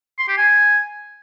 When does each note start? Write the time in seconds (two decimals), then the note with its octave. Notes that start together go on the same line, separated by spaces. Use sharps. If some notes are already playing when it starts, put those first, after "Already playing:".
0.19 C6
0.28 G4
0.38 G#5